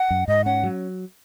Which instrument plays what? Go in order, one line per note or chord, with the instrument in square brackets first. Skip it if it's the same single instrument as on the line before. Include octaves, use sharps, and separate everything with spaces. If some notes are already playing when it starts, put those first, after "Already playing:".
Already playing: [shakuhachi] F#5
[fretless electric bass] F#2
[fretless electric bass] G#2 [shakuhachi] D#5
[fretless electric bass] C#4 [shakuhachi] F#5
[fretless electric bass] F#3